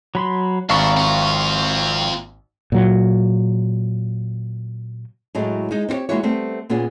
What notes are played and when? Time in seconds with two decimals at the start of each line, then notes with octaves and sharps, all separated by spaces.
0.15 F#3 B5 C6
0.70 G#1 G3 D4 F5 A#5 B5 C#6
0.97 C4 F4
2.72 A#2 F#3
5.35 A2 F#3 G#3 A3
5.71 G#3 D#4
5.89 C4 E4 G4 C#5
6.09 E3 G#3 A#3 E4 F#4 C#5
6.23 G3 A3 B3 C4
6.69 A#2 B3 C#4 F4 G#4